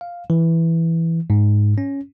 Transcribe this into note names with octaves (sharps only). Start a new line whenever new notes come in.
F5
E3
G#2
C#4